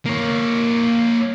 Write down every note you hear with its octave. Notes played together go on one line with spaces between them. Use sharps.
A#3 C#5